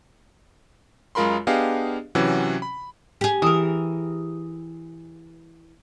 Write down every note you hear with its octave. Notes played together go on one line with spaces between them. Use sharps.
F#2 G#3 F4 A#4 B5 C6
B3 D4 G4 G#4 D#5 F5
C3 E3 F#3 C#4 F#4
B5
G4 G#4
E3 A#4 D#6